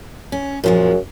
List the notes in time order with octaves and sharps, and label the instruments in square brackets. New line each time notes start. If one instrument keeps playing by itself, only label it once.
[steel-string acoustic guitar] C#4
[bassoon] F#2 [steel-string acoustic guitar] A#2 F3 G#3